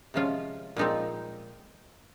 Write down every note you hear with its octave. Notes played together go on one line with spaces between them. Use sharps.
C3 F3 G#3 C#4 F4
A#2 F3 G#3 C4 D#4